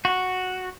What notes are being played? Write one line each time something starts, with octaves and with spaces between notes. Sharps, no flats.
F#4